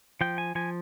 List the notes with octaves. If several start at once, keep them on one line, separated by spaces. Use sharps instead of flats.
F3 G5
G#5
F3 G#5